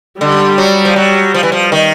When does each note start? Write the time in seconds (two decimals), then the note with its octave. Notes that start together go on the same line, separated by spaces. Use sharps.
0.20 D3 G3
0.58 F#3
0.85 F3
0.96 F#3
1.34 F3
1.43 E3
1.52 F3
1.72 D#3